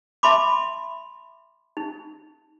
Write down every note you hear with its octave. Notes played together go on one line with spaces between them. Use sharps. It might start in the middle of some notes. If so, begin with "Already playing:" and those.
E5 A5 B5 C6 D6
D#4